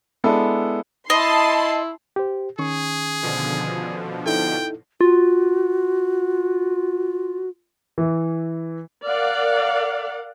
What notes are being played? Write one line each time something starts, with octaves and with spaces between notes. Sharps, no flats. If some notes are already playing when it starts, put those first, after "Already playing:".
G#3 B3 D4 E4 A4
E4 D#5 A5 B5 C6
G4 C5
D#3 C#4 G#4 C#6
B2 D3 F3
D#4 E4 A4 G5
F4 F#4
E3
A#4 D5 F5 F#5